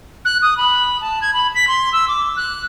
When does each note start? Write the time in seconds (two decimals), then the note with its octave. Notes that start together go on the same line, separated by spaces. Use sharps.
0.25 F#6
0.42 D#6
0.57 B5
1.01 A5
1.22 G#6
1.33 B5
1.55 B6
1.68 C6
1.93 E6
2.08 D6
2.36 F#6